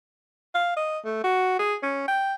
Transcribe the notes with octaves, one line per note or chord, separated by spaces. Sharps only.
F5
D#5
A3
F#4
G#4
C#4
G5